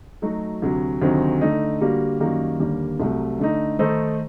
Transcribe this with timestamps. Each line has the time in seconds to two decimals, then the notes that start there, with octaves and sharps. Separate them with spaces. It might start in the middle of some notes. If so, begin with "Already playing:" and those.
0.22 F#3 A3 D#4 F#4
0.62 D2 C3 F#3
1.02 D2 C3 D#3 F#3 C4
1.41 D3 A3 D#4
1.81 D3 G3 A#3 F#4
2.20 F#2 D#3 G3 A#3 F#4
2.60 D#2 D3 G3 A#3
3.00 C2 C3 F#3 A3
3.39 D3 A3 D#4
3.79 D#3 A3 D#4 A4 C5